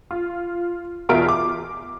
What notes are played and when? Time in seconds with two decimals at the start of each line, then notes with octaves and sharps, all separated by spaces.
0.11 F4
1.09 E2 B2 F4 A#4 E5 D7
1.29 D6